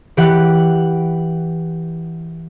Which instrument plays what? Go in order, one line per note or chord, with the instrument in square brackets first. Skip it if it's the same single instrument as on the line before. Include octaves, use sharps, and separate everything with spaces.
[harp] E3 G4 F#5